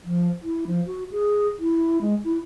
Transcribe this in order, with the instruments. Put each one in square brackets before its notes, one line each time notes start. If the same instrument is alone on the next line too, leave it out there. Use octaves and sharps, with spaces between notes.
[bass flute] F3
E4
F3
F#4
G#4
E4
G#3
E4